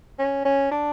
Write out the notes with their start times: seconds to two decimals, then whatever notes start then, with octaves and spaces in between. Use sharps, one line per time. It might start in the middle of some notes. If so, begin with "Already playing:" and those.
0.19 C#4
0.45 C#4
0.71 D4